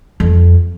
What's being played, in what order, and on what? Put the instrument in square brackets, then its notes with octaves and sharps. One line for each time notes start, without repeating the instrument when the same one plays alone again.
[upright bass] F2